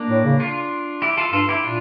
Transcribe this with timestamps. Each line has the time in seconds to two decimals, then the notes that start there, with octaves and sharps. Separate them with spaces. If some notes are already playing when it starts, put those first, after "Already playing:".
Already playing: A#3 D4
0.09 A2
0.24 C#3
0.40 D4 F4
1.02 E4 G4
1.17 F4 A4
1.33 G2 F4 A4
1.49 E4 G4
1.64 A#2 D4 F4